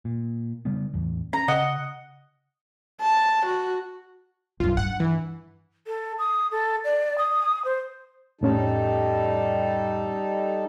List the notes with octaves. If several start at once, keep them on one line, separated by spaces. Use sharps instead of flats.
A#2
C#3 G3 B3
A1 E2
C#4 A#5
C#3 D#5 F#5
A5
F#4
B1 F#2 F4
G2 F#5
E3
A4
D#6
A4
D5
D#6
C5
F2 A2 G3 C#4 D#4 A4